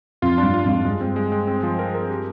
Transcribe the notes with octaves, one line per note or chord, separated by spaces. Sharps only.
F2 F4
D4
G2
F4
F2 G#2 F4
G2 G#3
C4
G#3
G#3
C4
F3
A#4
A#4
G4